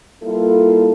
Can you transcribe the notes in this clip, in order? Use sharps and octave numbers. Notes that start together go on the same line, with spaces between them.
G3 A#3 E4 F4 A4